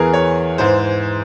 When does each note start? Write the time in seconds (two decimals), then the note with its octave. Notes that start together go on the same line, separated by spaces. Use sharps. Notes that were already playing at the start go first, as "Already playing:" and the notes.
Already playing: E2 E3 G#4 A#4
0.14 C#5
0.58 G#2 E3 C5